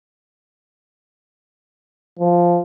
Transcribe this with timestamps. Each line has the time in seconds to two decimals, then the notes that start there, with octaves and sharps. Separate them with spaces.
2.19 F3